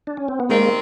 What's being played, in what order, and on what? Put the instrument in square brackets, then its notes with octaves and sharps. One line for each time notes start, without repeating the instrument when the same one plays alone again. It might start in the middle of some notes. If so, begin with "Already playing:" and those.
[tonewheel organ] D4
C#4
C4
B3
[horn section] D#3 G3 C4 [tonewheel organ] G#3 A#3